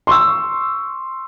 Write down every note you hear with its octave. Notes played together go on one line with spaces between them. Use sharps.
C6 C#6 E6